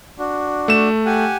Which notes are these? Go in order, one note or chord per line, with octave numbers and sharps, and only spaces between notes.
D4 F#4
A3 E7
G4 F#5 G#5